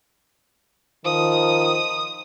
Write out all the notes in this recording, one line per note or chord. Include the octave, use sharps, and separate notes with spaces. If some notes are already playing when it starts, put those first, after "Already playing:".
D#3 F3 D#6